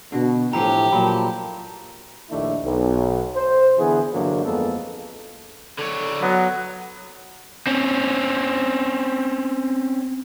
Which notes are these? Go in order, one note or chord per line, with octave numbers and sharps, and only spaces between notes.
B2 D3 F#4
A2 E3 F3 G4 F#5 A#5
A#2 F3 F#3 A5 B5
A#1 D#2 D#3 A3 D4 E4
B1
C5
D3 E3 B3 G#4
G2 D3 E3 F#3 A#3
F2 G#3 A#3 B3 A4
D3 C#5
F#3 B3 D#5
C4 C#4